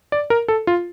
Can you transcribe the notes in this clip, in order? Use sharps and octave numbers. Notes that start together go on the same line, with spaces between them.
D5
A#4
A4
F4